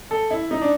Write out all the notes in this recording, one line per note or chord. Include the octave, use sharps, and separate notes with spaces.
A4
E4
D#4
D4